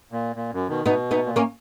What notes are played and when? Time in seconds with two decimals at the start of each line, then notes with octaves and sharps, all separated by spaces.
0.12 A#2
0.36 A#2
0.53 F#2
0.69 B2 D#3
0.85 B2 B3 D#4
1.11 B3 D#4
1.25 A#2
1.36 A#3 C#4